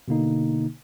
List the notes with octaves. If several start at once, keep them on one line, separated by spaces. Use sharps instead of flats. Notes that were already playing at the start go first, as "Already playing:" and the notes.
B2 D3 A#3 D#4